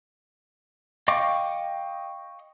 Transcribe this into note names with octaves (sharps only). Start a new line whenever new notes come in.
D#5 F5 G5 C#6 D6